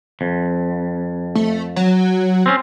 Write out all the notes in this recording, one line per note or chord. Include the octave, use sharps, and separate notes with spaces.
F2
A3
F#3
C4 C#4